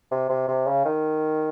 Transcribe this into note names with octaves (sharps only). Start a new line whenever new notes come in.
C3
C3
C3
C#3
D#3